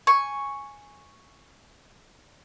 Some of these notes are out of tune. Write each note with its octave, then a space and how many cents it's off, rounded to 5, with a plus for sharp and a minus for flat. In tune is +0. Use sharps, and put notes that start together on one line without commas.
G#5 +0 C#6 +0